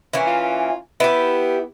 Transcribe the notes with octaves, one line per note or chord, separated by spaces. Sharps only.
E3 A#3 C#4
F4
B3 E4 G4